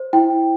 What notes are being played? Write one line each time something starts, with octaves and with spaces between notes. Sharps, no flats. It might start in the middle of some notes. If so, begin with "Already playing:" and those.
Already playing: C5
E4 G5